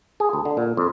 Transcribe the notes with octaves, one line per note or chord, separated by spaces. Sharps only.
G#4
D2
D3
A#2
F2